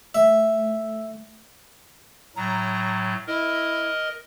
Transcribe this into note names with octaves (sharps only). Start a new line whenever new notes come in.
A3 E5
A2 F#3 A#5
E4 A#4 D#5